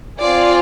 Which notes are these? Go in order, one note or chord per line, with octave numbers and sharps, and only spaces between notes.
C4 F4 G#4 D5